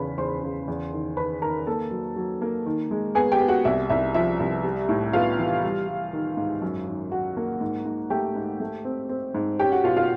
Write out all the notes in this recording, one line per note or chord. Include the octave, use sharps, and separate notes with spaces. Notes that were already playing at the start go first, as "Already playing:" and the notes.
Already playing: E2 C#3 B4 B5
E2 C5 C6
C#3
E2
D#3
D#3 B4 B5
D#3 A#4 A#5
A#3 A4 A5
F#3
F#3
A#3
D#3
G#3
B3 G#4 G#5
G4 G5
B3
F#4 F#5
C2 E5
C2 E5
F3 E5
C2
G3
A2
B3 F4 F5
E3
G3
G3
D#3
G#2
F#2
D#3
F#3 F#4 F#5
A#3
G#2
G#2
A3 G4 G5
G#2
A3
C4
C4
G#2
C#4 G4 G5
F#4 F#5
B2 F4 F5
F4 F5